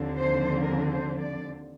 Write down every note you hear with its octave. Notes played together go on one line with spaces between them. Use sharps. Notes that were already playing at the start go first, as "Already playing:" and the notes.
Already playing: D#2 D3 F3 C4
C5
A#4
C5
D5